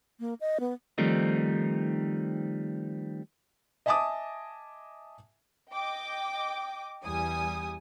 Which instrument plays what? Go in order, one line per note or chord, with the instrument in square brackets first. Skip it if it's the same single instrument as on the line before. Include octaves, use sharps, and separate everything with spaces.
[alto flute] A#3
D#5
B3
[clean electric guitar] D#3 F3 G3 A3 C4 D#4
[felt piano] D#5 E5 G#5 A5 D6 D#6
[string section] D#5 G5 D6
E2 G3 G#5 D#6